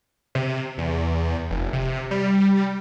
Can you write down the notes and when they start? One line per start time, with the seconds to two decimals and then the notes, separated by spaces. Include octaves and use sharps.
0.35 C3
0.78 E2
1.50 F1
1.73 C3
2.11 G3